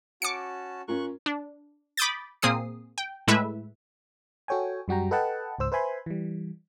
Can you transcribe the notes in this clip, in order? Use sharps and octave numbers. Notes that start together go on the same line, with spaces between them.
C#4 F#4 A5 D6 C#7
C#4 F4 A#4 C#6 F#6
D4
B5 D6 D#6 G6 A6
A#2 A#3 C4 G#4 D#6 C7
G5
A2 G#3 A3 E4 B4 E5
F#4 A4 C#5 G5 G#5
F#2 G3 F#4 G5 A#5
A4 B4 D#5 F#5 G5 A5
C#2 G#2 C5 E6
B4 C5 E5 G#5 B5 C6
E3 G3